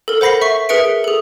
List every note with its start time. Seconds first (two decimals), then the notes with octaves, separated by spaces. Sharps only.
0.08 A4 A#4
0.21 C5 F#5 B5 A#6 C7
0.41 E5 C#6
0.69 G#4 A#4 B4 E5 C#7 D7
1.04 G#4 A4